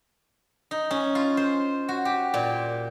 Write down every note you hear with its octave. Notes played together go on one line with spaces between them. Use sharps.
D#4
C#4
F4
C5
F#4
G4
A#2